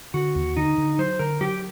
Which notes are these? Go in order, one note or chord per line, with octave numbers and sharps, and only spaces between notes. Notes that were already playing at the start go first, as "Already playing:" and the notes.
D3 F#4
D#2
D3 D#4
D3
F#3 C5
D3 A#4
F#3 G4